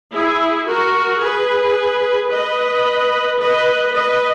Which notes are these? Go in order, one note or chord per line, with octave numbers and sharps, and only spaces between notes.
E4 G#4
F#4 A#4
G#4 B4
B4 D#5
B4 D#5
B4 D#5